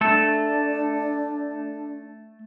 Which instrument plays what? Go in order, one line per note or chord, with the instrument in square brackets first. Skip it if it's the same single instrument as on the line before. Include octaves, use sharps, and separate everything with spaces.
[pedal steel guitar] A3 A4 [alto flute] D4